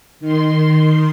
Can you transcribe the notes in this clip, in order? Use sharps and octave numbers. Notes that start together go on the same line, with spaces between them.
D#3 C6